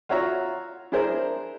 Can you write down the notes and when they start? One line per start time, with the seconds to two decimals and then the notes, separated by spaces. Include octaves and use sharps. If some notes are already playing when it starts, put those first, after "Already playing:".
0.09 F4 F#4 C#5 E5 A#5
0.92 D4 E4 G#4 A#4 C5